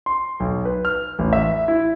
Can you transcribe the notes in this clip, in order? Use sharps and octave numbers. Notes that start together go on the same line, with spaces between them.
C6
B1
B4
F6
A1
E5
E4